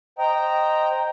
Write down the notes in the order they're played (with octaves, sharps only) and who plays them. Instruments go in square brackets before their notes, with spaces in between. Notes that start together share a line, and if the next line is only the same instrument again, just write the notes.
[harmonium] C5 G5 A#5 [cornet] D#5